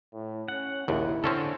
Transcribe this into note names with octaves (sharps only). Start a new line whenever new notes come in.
A2
C#4 F#5
A#1 D#2 E4
D3 C4 C#4 A4